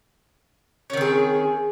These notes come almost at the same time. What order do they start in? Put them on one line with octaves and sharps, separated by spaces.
C#4 D#3 C4 G#4